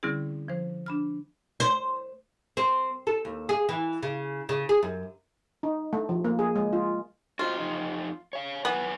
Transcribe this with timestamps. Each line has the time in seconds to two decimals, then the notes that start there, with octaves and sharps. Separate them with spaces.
0.03 D3 G3 C4 C#4 E4 G#4
0.48 F3 C5
0.86 D4 B5 F6
1.60 C5
2.57 C4
3.07 A4
3.25 D#2
3.49 G#4
3.69 E3
4.03 C#3
4.49 C#3
4.69 G#4
4.83 F#2
5.63 D#4
5.93 A3
6.09 F3
6.25 A#3
6.39 G#4
6.56 G#3
6.73 F4
7.39 F4 F#4 C5 D#5
7.58 F2 D#4
8.33 C#5 F5
8.65 F#2 B3 B4 G#5